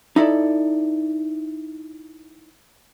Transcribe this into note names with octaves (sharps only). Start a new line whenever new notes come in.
D#4 E4 A4 D5